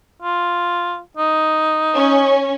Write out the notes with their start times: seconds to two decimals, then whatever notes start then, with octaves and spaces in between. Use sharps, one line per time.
0.22 F4
1.17 D#4
1.94 C#4